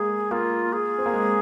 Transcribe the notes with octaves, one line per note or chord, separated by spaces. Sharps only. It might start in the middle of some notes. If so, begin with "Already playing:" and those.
Already playing: G#3 A#3 G#4
A#3 F4
G#4
C4
A#3
G#3